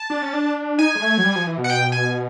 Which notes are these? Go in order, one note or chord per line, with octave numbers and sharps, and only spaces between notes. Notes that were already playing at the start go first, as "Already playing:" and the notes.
Already playing: A5
D4
C#4
D4
D#4 G#5
G#3
A3
F#3
G3
F3
E3
B2
F#5
G5
G#5